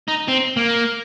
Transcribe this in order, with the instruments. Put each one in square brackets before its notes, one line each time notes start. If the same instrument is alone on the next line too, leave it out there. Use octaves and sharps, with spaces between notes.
[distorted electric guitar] D#4
C4
A#3